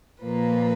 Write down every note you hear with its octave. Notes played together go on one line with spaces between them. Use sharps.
A#2 F3 A#3 B4